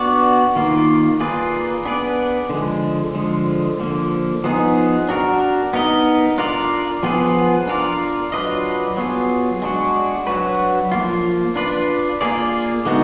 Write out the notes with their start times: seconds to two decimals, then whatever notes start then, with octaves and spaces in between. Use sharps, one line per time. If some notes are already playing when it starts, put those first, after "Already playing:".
Already playing: B3 D4 F#4 D5
0.56 D#3 A#3 F4
1.20 A#3 F4 G#4 B4 D5
1.85 B3 D4 G#4 B4 D5
2.50 D3 F3 G#3
3.15 D3 F3 G#3
3.80 D3 F3 A#3
4.44 F3 B3 D#4 G#4
5.09 D4 F#4 A#4
5.73 B3 D#4 A#4 D#5
6.38 D4 F4 A#4 D5
7.03 F3 B3 F4 G#4 B4
7.67 D4 F4 A#4 D5
8.32 F#3 D4 F4 B4 D#5
8.97 F#3 B3 F4 G#4
9.62 G#3 D4 F#4
10.27 F#3 D4 F#4 B4
10.92 F3 A#3 F4
11.56 D4 F4 B4 D5
12.21 A#3 F4 G#4 D5
12.85 D3 G#3 B3 D#4 F#4